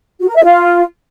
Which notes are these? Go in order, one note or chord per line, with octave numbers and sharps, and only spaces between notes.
F#4
A#4
E5
F4